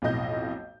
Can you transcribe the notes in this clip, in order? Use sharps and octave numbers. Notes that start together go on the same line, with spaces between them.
B1 F2 A2 D#5 G6